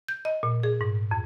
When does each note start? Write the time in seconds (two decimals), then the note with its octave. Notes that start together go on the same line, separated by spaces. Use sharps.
0.08 G6
0.25 D#5
0.43 A#2
0.63 G#4
0.81 G#2
1.11 F2